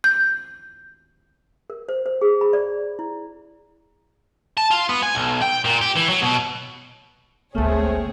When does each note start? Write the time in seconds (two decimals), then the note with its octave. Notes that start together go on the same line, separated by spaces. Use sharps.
0.04 G6
1.70 A#4
1.89 C5
2.06 C5
2.21 G#4
2.41 B5
2.53 D5
2.99 E4
4.57 A5
4.71 F4
4.89 B3
5.03 G#5
5.15 B1
5.42 G5
5.65 A#2
5.81 G4
5.96 E3
6.09 F#3
6.22 B2
7.55 G#1 D2 A3 A#3 C4 G#4 C#5